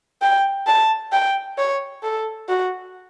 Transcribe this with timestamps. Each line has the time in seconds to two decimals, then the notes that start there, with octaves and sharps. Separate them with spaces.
0.22 G5
0.67 A5
1.12 G5
1.58 C#5
2.03 A4
2.49 F#4